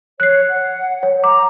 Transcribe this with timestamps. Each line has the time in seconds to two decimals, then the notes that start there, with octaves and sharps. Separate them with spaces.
0.20 C#5 F#6 C7
0.49 F#5
1.03 C#5
1.24 A#5 D6